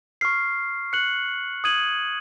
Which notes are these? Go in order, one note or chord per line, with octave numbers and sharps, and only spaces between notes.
C#6 F6 C7
F#6 C#7 F#7
D#6 G#6 D#7 F#7